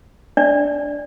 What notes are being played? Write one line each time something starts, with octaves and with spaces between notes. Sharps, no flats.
D4 D5